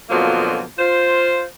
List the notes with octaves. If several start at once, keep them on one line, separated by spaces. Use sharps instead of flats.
F2 B2 D3 F3 F#3 A#3
F4 C5